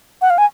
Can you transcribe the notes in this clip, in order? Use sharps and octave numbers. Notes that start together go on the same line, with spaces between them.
F#5
F5
G#5